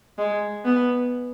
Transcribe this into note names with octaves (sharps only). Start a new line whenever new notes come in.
G#3
B3